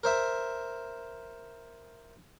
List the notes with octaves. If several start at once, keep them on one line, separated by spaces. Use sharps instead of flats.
A#4 C5 E5